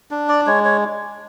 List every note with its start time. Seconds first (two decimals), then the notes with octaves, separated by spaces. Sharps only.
0.11 D4
0.29 D5
0.47 G#3 C#5
0.65 C#5